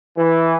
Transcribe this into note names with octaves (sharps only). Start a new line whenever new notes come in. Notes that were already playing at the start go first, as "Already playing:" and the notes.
E3